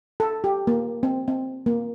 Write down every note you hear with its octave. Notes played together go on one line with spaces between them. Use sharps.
A4
G4
A#3
C4
C4
A#3